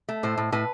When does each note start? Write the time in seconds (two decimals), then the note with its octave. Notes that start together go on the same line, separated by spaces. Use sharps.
0.09 A3
0.23 A2 C5
0.38 A2
0.52 A2 B4